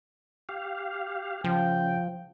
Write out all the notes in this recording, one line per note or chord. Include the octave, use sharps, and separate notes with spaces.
G4 F5
C#3 F3 G5